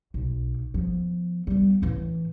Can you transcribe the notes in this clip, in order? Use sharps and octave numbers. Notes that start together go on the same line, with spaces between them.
B1
F3 B3
G3 B3
A2 E3